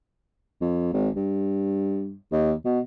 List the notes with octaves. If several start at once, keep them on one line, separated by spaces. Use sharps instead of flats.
F2
G#1
G2
D#2
B2